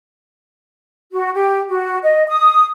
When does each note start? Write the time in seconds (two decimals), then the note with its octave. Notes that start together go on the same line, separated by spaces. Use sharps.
1.12 F#4
1.33 G4
1.69 F#4
2.03 D#5
2.28 D#6